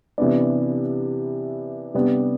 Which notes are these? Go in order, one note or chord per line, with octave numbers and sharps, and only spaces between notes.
C3 E3 B3 D4
C3 G3 B3 D4 G4